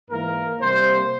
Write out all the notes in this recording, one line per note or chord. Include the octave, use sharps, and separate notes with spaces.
G#2 E3 A#3 A#4
C3 G3 A#3 C5